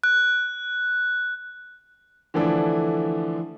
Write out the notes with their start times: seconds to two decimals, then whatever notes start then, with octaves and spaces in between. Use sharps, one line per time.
0.04 F#6
2.34 D3 E3 F3 A3 D4 E4